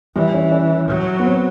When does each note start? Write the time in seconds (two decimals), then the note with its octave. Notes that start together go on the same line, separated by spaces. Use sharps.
0.15 E3 G3
0.34 C#4
0.52 C#4
0.88 F#3
1.20 B3
1.25 C4